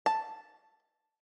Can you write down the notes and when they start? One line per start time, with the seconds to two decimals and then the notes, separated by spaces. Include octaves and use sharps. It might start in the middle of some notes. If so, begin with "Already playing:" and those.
0.06 A5